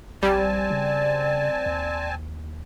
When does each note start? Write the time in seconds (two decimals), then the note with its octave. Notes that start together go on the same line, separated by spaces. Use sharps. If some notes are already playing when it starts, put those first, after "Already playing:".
0.23 A#1 G3 C4 D5 G#5 A5
0.71 C#3
1.66 D#2